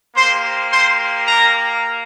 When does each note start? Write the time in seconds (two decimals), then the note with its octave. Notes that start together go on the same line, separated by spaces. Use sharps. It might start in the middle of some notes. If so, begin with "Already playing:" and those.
0.15 A#3 G4 C5 C6
0.71 C5 C6
1.27 A#4 A#5